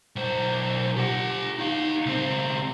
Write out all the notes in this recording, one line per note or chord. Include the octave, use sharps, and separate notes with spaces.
B1 C5
G4 F#5
D#4 F5
C#2 C4